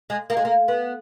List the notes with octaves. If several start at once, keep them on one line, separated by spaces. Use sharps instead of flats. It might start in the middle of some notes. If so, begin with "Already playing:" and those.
G#3
A#3
G#3
A#3
B3